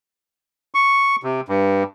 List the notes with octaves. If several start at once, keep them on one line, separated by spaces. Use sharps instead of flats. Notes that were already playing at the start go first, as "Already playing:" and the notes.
C#6
C3
G2